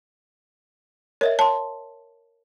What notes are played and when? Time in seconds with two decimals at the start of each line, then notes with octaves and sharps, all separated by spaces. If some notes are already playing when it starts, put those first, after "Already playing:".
1.21 A#4 C#5 D#5 E5
1.39 C#5 A5 C6